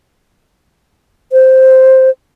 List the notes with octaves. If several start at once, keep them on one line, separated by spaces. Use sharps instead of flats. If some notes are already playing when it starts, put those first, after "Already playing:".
C5